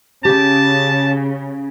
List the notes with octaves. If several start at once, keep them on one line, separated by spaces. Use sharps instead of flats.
C#3 G4 A5